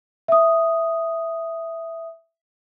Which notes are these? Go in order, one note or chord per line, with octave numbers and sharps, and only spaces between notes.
E5 D#6